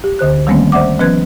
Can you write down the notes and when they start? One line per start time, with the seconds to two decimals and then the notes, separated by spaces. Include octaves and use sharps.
0.04 G4
0.19 D2 D3 C5 F#6
0.47 D#3 G3 A3 A#3 C4 C#4
0.72 C5 D5 E5 F#5 D6
0.99 F3 B3 C#4 B4 F#6 G#6